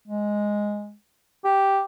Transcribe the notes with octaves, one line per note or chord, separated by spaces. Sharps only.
G#3
G4